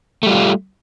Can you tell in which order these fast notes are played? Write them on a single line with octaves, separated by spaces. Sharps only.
A3 G3 F4